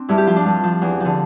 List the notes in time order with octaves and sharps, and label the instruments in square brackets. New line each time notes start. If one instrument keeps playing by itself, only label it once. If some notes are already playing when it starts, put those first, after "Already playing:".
Already playing: [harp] C4 D4
G2 E4
G4
F3 F4
D4
G2
F3
E2
D3 F3